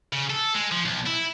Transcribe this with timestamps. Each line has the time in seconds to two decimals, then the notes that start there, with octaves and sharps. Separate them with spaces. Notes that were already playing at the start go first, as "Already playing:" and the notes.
0.13 C#3
0.30 A4
0.55 G#3
0.72 F3
0.85 B1
1.06 E4